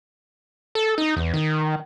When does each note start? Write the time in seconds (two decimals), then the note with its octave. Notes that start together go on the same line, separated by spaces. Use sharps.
0.75 A4
0.98 D#4
1.16 E2
1.34 D#3